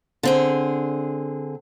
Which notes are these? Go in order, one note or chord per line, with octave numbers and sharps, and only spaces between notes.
D3 C4 G#4